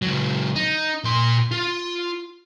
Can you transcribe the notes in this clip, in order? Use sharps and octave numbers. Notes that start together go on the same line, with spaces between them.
C#2 F#3
D#4
A#2 C6
F4